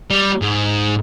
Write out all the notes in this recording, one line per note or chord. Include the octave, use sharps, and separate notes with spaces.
G3
G#2